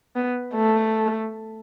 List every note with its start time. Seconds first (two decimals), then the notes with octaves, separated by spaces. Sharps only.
0.16 B3
0.54 A3